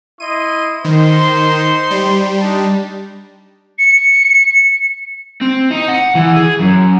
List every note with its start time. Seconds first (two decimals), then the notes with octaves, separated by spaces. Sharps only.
0.20 E4 D#5 C6 D#7
0.84 D#3 D#4 C5 C6
1.91 G3
2.41 D4 D#4 A5
3.78 C#7
5.41 C4
5.71 D#4
5.88 F#5
6.15 E3
6.37 G#4
6.60 F#2